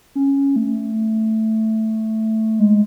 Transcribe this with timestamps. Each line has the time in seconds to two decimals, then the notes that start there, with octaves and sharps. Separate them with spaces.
0.15 C#4
0.56 A3
2.59 G#3